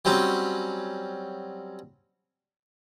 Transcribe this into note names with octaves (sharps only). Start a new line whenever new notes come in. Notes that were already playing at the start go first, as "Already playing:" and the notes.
F#3 G3 C4 C#4